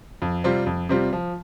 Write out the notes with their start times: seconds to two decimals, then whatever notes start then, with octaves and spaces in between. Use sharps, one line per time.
0.22 F2
0.44 C3 G3 C4 F4
0.66 F2
0.89 C3 G3 C4 F4
1.13 F3